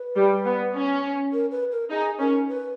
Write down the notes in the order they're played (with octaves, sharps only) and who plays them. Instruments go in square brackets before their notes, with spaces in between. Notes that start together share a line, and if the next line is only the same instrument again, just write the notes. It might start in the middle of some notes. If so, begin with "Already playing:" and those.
Already playing: [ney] B4
[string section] G3
B3
C#4
[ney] A#4
B4
A#4
[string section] D#4 [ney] G#4
[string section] C#4 [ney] A#4
[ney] B4